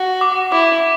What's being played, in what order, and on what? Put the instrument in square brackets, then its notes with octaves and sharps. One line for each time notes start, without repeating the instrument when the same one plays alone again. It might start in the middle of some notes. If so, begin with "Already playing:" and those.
Already playing: [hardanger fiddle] F#4
[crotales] D6
[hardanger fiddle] E4 [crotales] D6